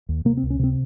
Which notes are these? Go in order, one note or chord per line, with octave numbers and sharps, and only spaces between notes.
D#2
C3 A#3
C4
C#2
C#4
C3 C4